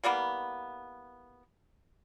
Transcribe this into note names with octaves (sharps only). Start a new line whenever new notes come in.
E3 G3 A#3 B3